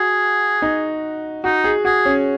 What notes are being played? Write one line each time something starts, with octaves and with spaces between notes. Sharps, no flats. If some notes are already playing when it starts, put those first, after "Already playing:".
Already playing: F#4 G#4
D#4
D#4 F#4
G#4
F#4 G#4
C#4